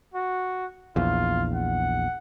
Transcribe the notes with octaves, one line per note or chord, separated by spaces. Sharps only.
F#4
A#1 E2 F4
F#5